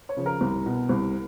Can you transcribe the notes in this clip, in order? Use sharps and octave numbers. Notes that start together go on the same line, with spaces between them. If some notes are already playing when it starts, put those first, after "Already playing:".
C#5
C#3 F3
A#4
C2
B2
C2